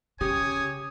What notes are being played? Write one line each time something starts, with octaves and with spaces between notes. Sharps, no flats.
C#3 G4 C#5 G#5 D#6